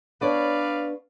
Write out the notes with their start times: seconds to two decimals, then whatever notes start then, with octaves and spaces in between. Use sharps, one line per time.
0.21 B3 D4 B4 C#5 D5 F5